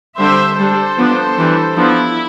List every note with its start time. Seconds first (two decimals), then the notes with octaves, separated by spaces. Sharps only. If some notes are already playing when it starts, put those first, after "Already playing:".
0.18 D3 G3 C4 C5 E5
0.58 G3 D4 A4 C5
0.98 F3 B3 D4
1.37 E3 G3 D4
1.76 F3 B3 D4 E4